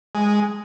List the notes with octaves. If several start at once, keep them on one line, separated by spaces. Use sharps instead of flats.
G#3